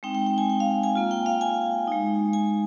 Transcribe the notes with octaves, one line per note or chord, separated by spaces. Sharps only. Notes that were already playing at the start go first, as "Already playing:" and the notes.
G#3 C4 D#4 G5
G5
G5
G#5
G5
F5
G#5
A#3 F4
G5
F5
G#5
G#3 D#4
G#5